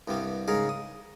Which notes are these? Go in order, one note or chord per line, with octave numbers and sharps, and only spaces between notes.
C2 G2 G3 B3
G#2 C#3 G#4 A#4
D#6